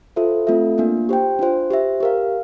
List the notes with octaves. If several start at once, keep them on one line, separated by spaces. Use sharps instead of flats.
F4 A4 C5 E5
A3 C4 F4 A4 E5
A#3 D4 F4
G4 C5 G5
D4 F4 C5
G4 C5 E5
G4 A#4 F5